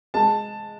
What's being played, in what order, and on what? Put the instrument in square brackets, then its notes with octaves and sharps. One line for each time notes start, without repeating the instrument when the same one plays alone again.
[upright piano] G#3 A5